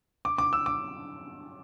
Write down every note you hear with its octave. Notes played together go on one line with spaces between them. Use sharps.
D6
D6
E6
D6